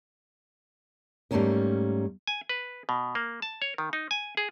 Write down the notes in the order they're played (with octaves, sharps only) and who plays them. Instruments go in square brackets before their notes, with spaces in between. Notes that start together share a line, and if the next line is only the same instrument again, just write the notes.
[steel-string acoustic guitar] G#2 G3 A3 A#3 C#4 A#4
[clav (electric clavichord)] G#5
B4
B2
A#3
A5
C#5
D#3
D#4
G#5
G#4